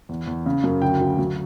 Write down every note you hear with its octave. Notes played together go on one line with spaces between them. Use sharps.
E2
E2
C#3
F#2
D2 G5
D2
F#3